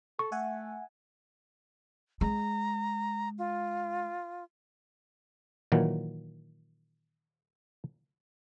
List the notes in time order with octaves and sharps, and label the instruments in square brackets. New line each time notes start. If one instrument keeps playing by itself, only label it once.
[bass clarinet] A4 [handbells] C#6
[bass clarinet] A3 [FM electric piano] E5 F#5 G#5
[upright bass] G#3 [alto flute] A#5
[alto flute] F4
[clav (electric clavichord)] A#2 D#3 E3 F#3